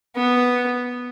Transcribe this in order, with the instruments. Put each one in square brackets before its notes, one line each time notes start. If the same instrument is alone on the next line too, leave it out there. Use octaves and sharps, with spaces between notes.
[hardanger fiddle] B3